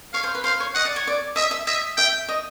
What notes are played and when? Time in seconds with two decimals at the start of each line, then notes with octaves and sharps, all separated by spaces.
0.14 C#5 F5
0.24 C5
0.35 B4
0.44 C5 F5
0.60 C#5
0.74 D#5 F#5
0.85 D5
0.96 C#5
1.07 D5
1.36 D#5 E5
1.51 E5
1.67 D#5 E5
1.97 E5 G5
2.28 D#5